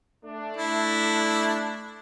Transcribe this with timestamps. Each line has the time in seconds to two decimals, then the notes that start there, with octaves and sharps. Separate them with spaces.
0.25 A3 D4
0.57 E4